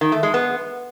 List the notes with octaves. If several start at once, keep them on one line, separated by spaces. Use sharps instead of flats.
D#3
A3
G#3
B3